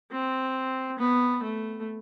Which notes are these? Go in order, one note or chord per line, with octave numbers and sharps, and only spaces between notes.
C4
B3
A3